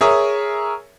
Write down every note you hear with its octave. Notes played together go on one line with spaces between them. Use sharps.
G#4 A#4 C#5 E5 D#6